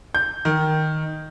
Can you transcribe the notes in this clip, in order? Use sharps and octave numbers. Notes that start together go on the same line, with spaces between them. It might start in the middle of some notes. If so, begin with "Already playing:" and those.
G6
D#3